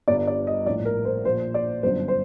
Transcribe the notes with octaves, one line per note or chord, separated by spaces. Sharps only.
G1 G2 D3 D5
D5
D#5
A#1 A2 D5
A#4
C5
A#1 A#2 C5
D5
G1 F#2 D3 C5
C5